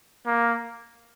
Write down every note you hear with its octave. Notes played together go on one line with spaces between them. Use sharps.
A#3